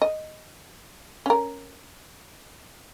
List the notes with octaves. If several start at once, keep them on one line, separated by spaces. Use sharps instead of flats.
D#5
C#4 A#4